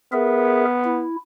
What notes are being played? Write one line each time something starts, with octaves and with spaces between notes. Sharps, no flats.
B3 G#4 A#4 E5
E4